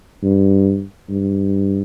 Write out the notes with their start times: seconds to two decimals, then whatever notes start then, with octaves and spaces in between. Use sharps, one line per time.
0.23 G2
1.09 G2